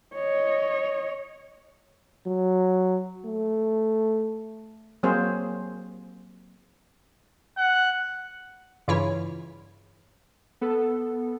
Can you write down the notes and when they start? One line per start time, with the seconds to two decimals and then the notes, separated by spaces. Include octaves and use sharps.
0.15 C#5 D#5
2.26 F#3
3.26 A3
5.03 F#3 A#3 C4 G#4 C5
7.57 F#5
8.88 G2 C#3 E3 E4 F4 C#5
10.61 B3 A4